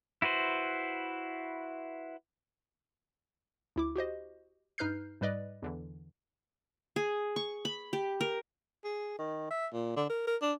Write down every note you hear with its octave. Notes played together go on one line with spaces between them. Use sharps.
E4 F#4 B4 C5
D2 E4 D6
F#4 G4 C5 D#5
G2 D#4 B4 F6 G6 C7
G#2 G3 B4 D5 D#5
E2 D3 E3
G#4
C#6
B5
G4
A#4
G#4
D#3
E5
A#2
D3
A#4
A#4
D4